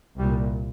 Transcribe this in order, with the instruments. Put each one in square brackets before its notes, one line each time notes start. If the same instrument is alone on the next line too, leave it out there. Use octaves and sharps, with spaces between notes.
[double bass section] C2 A#2 G3